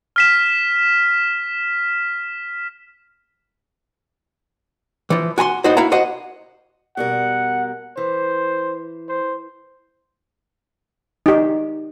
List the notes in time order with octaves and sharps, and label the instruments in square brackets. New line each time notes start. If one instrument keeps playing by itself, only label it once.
[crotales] F6 B6 E7
[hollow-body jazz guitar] E3 F3
F#4 G#5 A#5 C6
A2 D#4 F#4 C5
E4 F#4 F5 A#5
F#4 C5 D#5 F#5
[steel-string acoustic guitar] B2 G3 A#4 [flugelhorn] F#5
[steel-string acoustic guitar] E3 [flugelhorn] C5
[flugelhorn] C5
[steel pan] D#4 G4